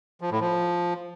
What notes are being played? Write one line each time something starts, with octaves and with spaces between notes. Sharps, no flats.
F3
A2
F3